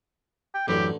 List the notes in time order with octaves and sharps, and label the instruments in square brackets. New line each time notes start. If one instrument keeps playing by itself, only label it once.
[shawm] G5
[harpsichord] A1 D3 [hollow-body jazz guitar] F#2 E3 [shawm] G4